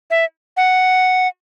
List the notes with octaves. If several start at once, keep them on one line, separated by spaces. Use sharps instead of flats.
E5
F#5